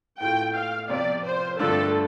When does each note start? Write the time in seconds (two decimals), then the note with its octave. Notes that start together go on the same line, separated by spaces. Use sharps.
0.20 A2 A3 F4 G5
0.55 F5
0.89 C3 F3 C4 F4 D5
1.25 C5
1.59 G2 D3 A3 D4 F4 A4